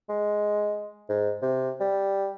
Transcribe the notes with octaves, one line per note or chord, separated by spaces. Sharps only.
G#3
G#2
C3
G3